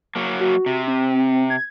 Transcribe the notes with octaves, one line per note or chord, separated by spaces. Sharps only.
F#3 A#3
F#4
C3
C4
G#6